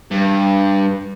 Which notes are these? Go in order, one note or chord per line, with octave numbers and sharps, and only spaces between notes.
G2